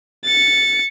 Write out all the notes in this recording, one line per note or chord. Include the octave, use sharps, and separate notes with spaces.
A6 C#7